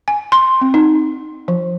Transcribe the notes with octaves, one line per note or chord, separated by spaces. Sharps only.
G#5
C6
C4
D#4
F3